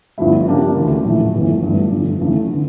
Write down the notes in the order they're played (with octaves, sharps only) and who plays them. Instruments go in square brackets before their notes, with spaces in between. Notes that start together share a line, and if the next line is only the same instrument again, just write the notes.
[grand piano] G1 G2 F3 A3 E4
C#3 F3 A#3 D4 G4
D2 C#3 E3 A3 E4
A#1 A2 E3 A3 E4
G1 F2 E3 A3
G1 G2 E3 A3
F1 F2 D3
C#3 E3 A3
D3